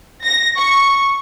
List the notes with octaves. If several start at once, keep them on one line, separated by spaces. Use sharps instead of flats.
A#6
C#6